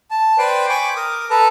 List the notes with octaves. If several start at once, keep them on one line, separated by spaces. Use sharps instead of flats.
A5
B4 C5 D5 G5 C6
G5 G#5 B5 C#6 D6
A#4 D6 D#6
A4 B4 A5 A#5